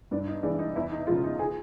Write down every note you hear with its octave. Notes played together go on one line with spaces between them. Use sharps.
G2 D4
D#4
E3 G#3 D4
D#4
E2 E4
D#4
C#3 F3 G#3 F4
D#4
G#4